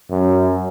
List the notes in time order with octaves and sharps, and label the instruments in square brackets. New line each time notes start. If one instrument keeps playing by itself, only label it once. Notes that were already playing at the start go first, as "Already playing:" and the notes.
[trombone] F#2